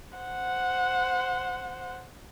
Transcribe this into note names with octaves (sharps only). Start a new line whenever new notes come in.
C5 F#5